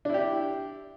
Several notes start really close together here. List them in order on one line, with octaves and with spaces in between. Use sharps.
D4 E4 G4